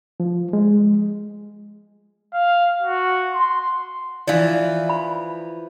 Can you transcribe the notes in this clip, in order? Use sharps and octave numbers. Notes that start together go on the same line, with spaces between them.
F3
G#3
F5
F#4
C6
E3 F3 D5 F5
B5